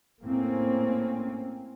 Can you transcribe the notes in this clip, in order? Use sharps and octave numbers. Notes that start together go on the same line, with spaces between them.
A2 A#3 C4 C#4